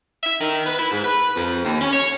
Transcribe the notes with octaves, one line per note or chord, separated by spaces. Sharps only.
E5
D#3
B4
E4
G#2
B4
F2
D#2
C#4
C#5